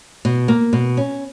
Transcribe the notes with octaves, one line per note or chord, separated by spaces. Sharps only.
B2
A#3
B2
C#4